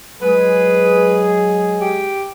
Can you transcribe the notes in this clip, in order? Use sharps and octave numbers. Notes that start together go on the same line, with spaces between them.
F#3 G#3 G#4 B4
G4